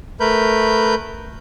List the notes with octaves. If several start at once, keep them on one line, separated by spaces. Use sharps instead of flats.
A3 A#4 B4 B5 G6